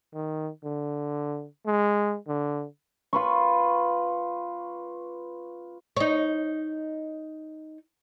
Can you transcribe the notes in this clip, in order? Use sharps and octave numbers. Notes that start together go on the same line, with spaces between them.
D#3
D3
G#3
D3
F4 B4 C#6
D#4 C#5